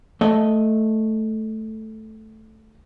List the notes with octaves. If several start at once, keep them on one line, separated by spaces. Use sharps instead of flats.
A3 D#5